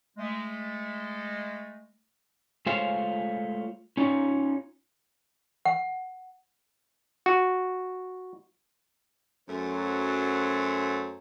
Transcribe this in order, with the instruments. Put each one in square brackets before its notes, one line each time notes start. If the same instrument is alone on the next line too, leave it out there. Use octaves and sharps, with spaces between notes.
[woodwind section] G#3 A3
[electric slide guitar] G#3 A3 F4 C5 C#5 F5
C#4 D#4 F4 C#5
[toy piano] F#5
[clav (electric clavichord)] F#4
[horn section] F#2 F#3 A3 C5